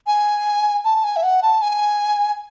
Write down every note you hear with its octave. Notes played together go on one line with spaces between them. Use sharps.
G#5
A5
G#5
E5
F#5
A5
G#5